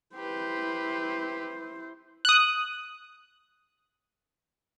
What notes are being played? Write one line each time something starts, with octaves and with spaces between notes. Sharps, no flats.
E4 G4 B4 C5
D#6 F#6